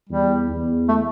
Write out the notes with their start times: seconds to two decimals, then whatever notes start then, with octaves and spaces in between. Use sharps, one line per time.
0.09 E2 G3
0.49 E2
0.89 A3